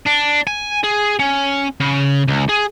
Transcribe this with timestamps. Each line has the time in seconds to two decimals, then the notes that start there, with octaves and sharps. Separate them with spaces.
0.07 D4
0.47 G#5
0.84 G#4
1.19 C#4
1.80 C#3
2.28 C#2
2.49 G#4